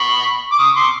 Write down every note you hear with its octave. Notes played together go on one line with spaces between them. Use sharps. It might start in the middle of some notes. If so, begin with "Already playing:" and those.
Already playing: B5 C#6
D6
C#6 D#6
C6 D6